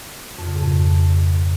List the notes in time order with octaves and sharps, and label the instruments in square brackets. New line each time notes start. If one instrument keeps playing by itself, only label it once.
[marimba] F2
C#3
G#2
F2